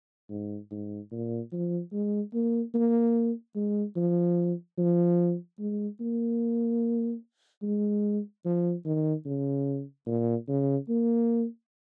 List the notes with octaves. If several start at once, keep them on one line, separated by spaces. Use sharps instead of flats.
G#2
G#2
A#2
F3
G#3
A#3
A#3
G#3
F3
F3
G#3
A#3
G#3
F3
D#3
C#3
A#2
C#3
A#3